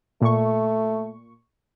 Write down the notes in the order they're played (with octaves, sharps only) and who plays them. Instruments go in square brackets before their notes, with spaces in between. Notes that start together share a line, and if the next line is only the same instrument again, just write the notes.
[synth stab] A#2 C#6 [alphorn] A3